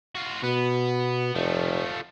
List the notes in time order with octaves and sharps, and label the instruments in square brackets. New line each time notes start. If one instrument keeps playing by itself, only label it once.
[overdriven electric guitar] F4 F#4
[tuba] B2 [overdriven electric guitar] B3
[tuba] F1 [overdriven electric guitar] F3 A3